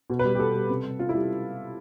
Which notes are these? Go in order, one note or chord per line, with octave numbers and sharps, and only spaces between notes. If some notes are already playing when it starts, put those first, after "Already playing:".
B2
B4
G3
G4
B2 A4
G3
C3
G3
C3 F4
E4
G3